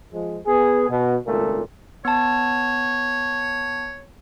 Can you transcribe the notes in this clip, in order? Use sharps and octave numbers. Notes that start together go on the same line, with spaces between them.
F3 G#3
B3 G#4
B2
G#1 C#2 A#2 A3
B3 C#5 A5